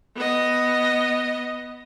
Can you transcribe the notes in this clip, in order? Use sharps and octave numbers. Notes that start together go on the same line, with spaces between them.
B3 D#5